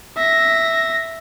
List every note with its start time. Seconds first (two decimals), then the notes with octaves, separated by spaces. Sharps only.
0.17 E5 A#6